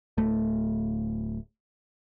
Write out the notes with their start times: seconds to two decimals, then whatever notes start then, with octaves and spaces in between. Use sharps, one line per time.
0.17 D1 A3